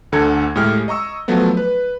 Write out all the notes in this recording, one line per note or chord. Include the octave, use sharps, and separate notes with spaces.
D2 D3 A4 A#5 G#6
A2 G#3 G4 F6
D#5 A#5 C#6 E6
F3 F#3 A3 B3
B4